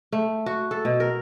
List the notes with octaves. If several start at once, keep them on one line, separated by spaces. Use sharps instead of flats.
A3
F#4
A4
B2
A#4